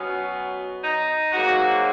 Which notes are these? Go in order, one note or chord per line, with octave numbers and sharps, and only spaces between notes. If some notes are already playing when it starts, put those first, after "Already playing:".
Already playing: B2 F#3 B3 C#4
D#4
G#2 F#3 A#3 F#4